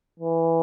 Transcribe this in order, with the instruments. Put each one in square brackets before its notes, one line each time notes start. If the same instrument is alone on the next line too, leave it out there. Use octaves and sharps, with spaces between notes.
[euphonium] E3